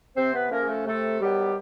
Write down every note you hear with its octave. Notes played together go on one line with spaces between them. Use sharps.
C3 C4 C5
B3 B4
F3 A3 A#3 C#4 A#4
G#4
A3 A4
C3 A3 A4
D#3 F#3 G3 B3 G4